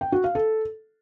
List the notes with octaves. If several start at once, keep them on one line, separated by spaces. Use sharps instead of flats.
G5
F#4
F5
A4